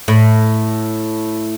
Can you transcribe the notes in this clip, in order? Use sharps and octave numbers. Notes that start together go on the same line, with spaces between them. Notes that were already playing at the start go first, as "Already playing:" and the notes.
A2